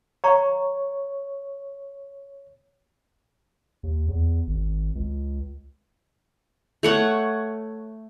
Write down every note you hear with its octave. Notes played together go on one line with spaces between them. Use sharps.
C#5 F5 A#5 C#6
D#2
E2
G#1
C#2
A3 C#5 F#5